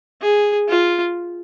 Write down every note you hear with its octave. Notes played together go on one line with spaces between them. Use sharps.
G#4
F4